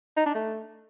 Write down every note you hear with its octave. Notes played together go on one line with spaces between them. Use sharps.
D#4
D4
A3